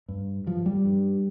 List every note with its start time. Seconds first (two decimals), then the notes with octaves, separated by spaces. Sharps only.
0.08 G2
0.46 G2 F3
0.66 G3
0.85 G2